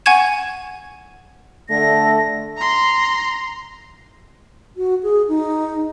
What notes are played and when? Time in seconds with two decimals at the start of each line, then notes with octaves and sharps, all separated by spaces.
0.06 F#5 G#5 C#6 G#6 E7
1.69 D3 A3 A#6
2.57 A#5 C6
4.77 F#4
5.03 G#4
5.29 D#4